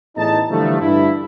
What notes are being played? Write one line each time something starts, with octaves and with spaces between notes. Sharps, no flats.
A1 E2 D#4 A5
D3 E3 F3 G3 A3
G2 E4